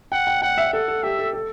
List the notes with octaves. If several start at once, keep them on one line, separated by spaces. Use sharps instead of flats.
F#5 G5
G5
F#5 G5
E5
A4 F#5
A4
G4 E5
A4
A4